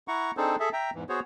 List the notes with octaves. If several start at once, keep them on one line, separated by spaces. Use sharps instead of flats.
E4 F#5 A#5 C#6
C4 D4 D#4 G#4 A4 C5
G#4 A4 E5
E5 G5 A#5
E2 G#2 E3
B3 F#4 G#4 C5 C#5